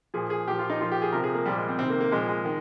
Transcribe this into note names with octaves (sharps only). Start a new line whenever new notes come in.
A#2 F3 G#4
G#4
A#2 F3 G4
F4
D#4
A#2 F3 F4
G4
G#4
C3 F3 A#4
G#4
A#3
A#2 F3 G3
G#3
C4
C3 D#3 C4
A#3
A#3
A#2 F3 G#3
G#3
D#3